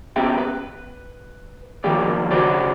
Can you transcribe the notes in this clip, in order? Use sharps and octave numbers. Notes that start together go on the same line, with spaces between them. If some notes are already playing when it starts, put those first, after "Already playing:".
B3 C#4 G4 E5 G5
B4
D#3 F3 F#3 A#3 G4 D5
C#3 F#3 F#4 B4 C5 D5